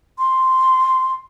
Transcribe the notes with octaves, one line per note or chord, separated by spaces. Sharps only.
C6